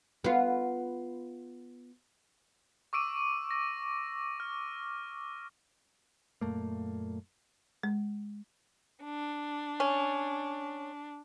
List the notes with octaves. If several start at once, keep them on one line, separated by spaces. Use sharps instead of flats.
B3 F4
C#6 D6 E6 D7 D#7
A#6
F6
F#2 A#2 A3 A#3
G#3
D4
C#4